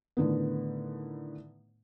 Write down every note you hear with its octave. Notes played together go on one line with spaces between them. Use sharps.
A2 D3 D#3 B3